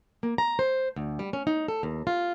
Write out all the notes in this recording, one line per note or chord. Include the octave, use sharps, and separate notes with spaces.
A#3
A#5
C5
D2
G3
C#4
D#4
A4
D#2
F4